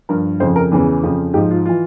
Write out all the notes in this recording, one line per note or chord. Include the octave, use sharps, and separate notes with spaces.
G2 F3 A#4
F2 C#3 F3 C5
A#4
E2 C#3 E3 G#4
F2 C#3 F3
G#2 F3 G4
F4
E3 F4